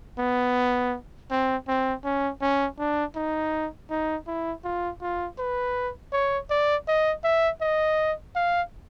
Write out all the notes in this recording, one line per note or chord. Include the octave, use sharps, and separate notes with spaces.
B3
C4
C4
C#4
C#4
D4
D#4
D#4
E4
F4
F4
B4
C#5
D5
D#5
E5
D#5
F5